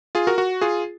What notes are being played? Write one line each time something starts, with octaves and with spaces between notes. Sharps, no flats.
F4 G#4
F#4 A#4
F#4
F4 G#4